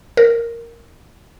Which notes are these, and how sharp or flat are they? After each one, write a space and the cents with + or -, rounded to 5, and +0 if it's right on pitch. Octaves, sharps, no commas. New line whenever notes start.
A#4 -5